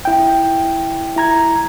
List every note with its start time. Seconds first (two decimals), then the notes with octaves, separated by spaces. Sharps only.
0.05 E4 G5
1.16 E4 A#5 G#6